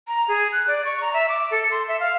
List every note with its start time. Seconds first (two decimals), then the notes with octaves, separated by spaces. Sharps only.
0.08 A#5
0.28 G#4
0.52 F#6
0.68 D5
0.85 C#6
1.01 A#5
1.13 E5
1.29 D6
1.51 A4
1.71 C6
1.88 E5
2.00 F5